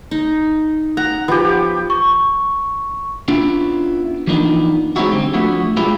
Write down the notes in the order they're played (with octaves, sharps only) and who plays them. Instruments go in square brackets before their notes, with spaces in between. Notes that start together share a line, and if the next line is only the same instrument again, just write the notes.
[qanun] D#4
[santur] F#5 [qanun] A#5
[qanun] F3 [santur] B3 G4
[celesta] C#6
[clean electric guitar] B3 C#4 D4 E4 F4
E3 F3 A#3 B3 D4 D#4
G#3 C4 C#4 D#4 E4 F#4
D3 G3 C4
F3 A3 B3 D4 E4 F#4
G3 G#3 B3 E4 F4